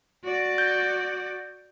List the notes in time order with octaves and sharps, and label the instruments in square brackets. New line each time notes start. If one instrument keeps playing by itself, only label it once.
[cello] F#4 D5
[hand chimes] G6